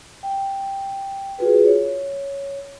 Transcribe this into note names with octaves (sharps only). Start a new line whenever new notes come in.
G5
F4 F#4 G#4 B4
C#5